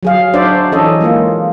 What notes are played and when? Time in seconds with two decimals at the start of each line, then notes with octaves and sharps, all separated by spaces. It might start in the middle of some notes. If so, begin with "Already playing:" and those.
0.03 F#3 G#4 F5
0.33 D4 D#4 F#4 C5 D5 E5
0.72 E3 C#4 D#4 A4 C#5 D#5
1.01 G#3 A#3 F4